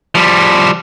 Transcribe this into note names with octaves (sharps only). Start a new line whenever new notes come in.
F3 G3